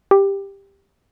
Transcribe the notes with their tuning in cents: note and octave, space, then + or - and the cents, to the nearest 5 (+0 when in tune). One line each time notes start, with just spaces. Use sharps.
G4 +10